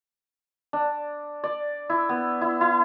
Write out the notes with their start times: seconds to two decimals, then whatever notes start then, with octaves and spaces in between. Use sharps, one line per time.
0.73 D4
1.44 D5
1.90 E4
2.09 B3
2.41 E4
2.61 E4